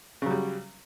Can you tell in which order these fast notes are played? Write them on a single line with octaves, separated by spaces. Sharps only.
C#3 F#3 G3